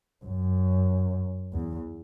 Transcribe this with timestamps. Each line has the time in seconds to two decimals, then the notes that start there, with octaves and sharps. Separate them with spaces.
0.24 F#2
1.53 E2